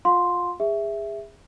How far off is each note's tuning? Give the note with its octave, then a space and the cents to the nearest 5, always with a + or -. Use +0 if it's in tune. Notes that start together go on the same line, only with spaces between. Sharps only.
F4 +15 F5 +40 C6 +0
G#4 -30 E5 +0